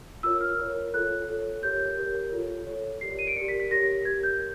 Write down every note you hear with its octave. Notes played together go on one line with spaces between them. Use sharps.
F4 A#4 C#5 E6
F6
F4 A#4 C#5
F4 A4 C#5 F#6
F4 A4 C#5
G4 A#4 C#5 G6
G4 A#4 C#5
F4 A4 C#5
F4 A4 C#5
G4 A#4 D5 C7
D#7
D7
G4 A#4 D5 C#7
B6
B6
G4 A#4 C#5 A#6
G4 A#4 C#5 G#6
G6